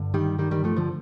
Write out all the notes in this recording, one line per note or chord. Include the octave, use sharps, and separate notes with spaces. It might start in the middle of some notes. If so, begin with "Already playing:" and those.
Already playing: G2 D3
D#3 G3
D#3 G3
D#3 G3
F3 A3
D3 F3